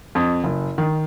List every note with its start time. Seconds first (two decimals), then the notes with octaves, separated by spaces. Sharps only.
0.15 F2
0.44 F#1
0.78 D#3